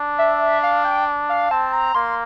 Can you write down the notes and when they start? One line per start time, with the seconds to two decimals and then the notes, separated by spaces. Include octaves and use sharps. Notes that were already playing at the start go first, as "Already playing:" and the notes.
Already playing: D4
0.18 E5
0.63 F5
0.85 G5
1.29 F5
1.51 C4 A5
1.73 A#5
1.95 A#3 C6